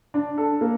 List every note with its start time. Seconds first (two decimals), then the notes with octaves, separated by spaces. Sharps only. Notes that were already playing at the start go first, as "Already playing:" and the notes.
0.14 D4
0.38 A4
0.61 A#3